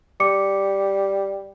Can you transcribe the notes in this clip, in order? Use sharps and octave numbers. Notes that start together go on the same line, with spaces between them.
G3 D6 C#7